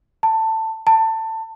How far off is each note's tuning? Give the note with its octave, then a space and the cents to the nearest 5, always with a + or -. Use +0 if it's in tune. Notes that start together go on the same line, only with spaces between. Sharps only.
A5 +15
A5 +20